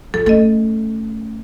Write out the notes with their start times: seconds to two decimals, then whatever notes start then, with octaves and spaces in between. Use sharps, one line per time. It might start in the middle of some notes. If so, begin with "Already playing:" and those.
0.14 F3 A4
0.26 A3 C#4 A4 D#5